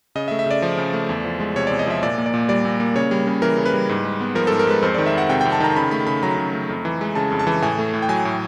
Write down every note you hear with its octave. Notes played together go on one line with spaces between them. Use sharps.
C#3 D#5
E5
A3
E5
C#3 D5
F3
C#3
A3
E2
F3
G#3
C3 C#5
E2 D5
D#5
F3 E5
A#2 D5
A#3
D5
A#2
G3 D5
A#2
A#3
C#3 C#5
G3
C#3
E3 A#4
C#3
B4
G3
G#2
G#3
B3
F3 A#4
G#2 A4
A#4
G#3 B4
F2 C5
D#3 D5
E5
F2 F#5
C3 G5
F2 G5
A5
D#3 A#5
C#3 B5
A3 B5
C#3 B5
F#3 A#5
C#3
A3
F2
E3
G#3
C#3 A5
F2
A5
E3
A2 G#5
A3
A2
G5
F#3 G#5
A2